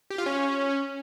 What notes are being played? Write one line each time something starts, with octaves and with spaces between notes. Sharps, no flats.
G4
F4
C#4